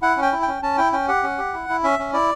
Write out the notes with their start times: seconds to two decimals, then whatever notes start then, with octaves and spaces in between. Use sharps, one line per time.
0.02 E4 F#5
0.17 C#4
0.22 G5
0.32 E4
0.42 G5
0.48 C#4
0.62 C#4 A5
0.77 E4 G5
0.92 C#4 G5
1.08 G4 F#5
1.23 C#4
1.38 G4
1.53 E4
1.69 E4
1.83 C#4 E5
1.99 C#4
2.13 E4 D5